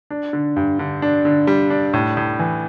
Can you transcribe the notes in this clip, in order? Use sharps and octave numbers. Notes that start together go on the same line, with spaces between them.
D4
D3
G2
D3
D4
D3
G3
D4
A2
A2
E3